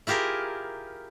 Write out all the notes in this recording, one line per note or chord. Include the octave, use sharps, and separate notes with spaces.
E4 F4 G4 G#4 A#4